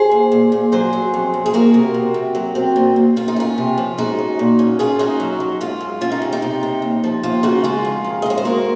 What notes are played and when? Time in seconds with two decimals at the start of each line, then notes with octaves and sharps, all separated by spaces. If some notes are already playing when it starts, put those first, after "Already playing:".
Already playing: G#4 C5
0.11 D#2
0.32 A#2
0.52 A#2
0.72 F#3 G#4 C5
0.93 F#3
1.14 F2
1.34 F2
1.46 G#4
1.53 A#3 F#4 A#4
1.74 C3
1.94 C3
2.14 C3
2.35 F#3
2.55 C4
2.76 A#2
2.96 A#2
3.16 A#2 F4
3.28 D#4
3.36 C#4 F4
3.58 C3
3.78 F3
3.98 G#3 D#4 F#4
4.18 C#4
4.39 A#2
4.59 C#4
4.79 C#4 F4 G#4
4.99 C#4 D#4 F#4
5.20 F#3
5.40 F#3
5.61 G#2 F4
5.81 G#2
6.01 C#4 F4
6.12 D#4
6.22 C3
6.33 D#4
6.42 C3
6.63 C3
6.82 D#2
7.04 F3
7.23 D#2 F4
7.43 C#3 D#4 F#4
7.64 G#3 F4 G#4
7.85 F2
8.04 D#3
8.22 D#5
8.26 G#3 C#5
8.38 C5
8.45 A#3 F#4 A#4